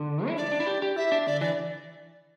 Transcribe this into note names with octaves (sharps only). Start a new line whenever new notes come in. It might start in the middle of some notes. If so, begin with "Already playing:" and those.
Already playing: D3
E4
D4 D5
D4
E4
G4
G4
E4 E5
D4
D3 D5
E3 D5